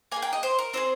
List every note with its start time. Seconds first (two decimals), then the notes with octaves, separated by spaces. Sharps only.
0.12 A#3 D#4 G#4 G#5
0.22 G5
0.33 D#5
0.43 C5
0.59 A#4
0.73 C4 F4 G#4 C5